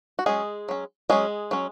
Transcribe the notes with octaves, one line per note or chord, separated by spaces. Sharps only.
F#4
F#3 G#3 C#4 G#4
F#3 C#4
F#3 G#3 C#4 G#4
F#3 C#4